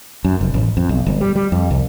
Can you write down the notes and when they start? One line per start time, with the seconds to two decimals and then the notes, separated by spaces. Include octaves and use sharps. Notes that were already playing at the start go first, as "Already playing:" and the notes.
0.25 F#2
0.41 F1
0.54 A1
0.77 F2
0.89 B1
1.07 G1
1.21 G3
1.36 G3
1.52 F2
1.71 C2